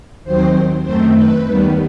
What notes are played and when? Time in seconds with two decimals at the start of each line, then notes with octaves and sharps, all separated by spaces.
0.24 D#2 D#3 F#3 C4 C5
0.83 F#2 D#3 A3 C4 C5
1.13 B4
1.43 D#2 D#3 G3 B3